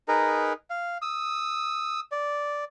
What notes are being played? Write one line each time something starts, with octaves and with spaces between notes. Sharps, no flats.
D#4 G#4 A#4 B4
F5
D#6 E6
D5